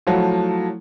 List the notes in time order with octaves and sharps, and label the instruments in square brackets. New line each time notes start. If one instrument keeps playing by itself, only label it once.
[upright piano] F3 F#3 A3 E4